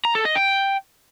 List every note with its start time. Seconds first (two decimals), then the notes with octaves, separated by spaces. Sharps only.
0.05 A#5
0.15 A4
0.25 D#5
0.35 G5